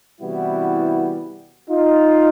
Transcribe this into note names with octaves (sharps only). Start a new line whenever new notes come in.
C3 E3 G3 B3 E4 F#4
D#4 F4